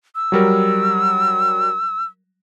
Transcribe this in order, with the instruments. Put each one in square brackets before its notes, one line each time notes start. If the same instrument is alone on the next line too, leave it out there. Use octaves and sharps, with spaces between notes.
[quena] E6
[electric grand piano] F#3 G3 A#4